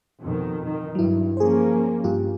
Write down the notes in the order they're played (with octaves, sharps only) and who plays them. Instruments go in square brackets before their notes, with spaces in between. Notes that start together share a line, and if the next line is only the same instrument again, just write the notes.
[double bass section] F2 B2 D#3
D#3
[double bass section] G2 [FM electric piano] F#3 E4
[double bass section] F3 A#3 C#4 [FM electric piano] G#4 C5
[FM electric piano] G2 F4 G4